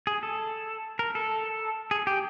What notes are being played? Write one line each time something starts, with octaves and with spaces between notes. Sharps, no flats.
G#4
A4
A#4
A4
G#4
G4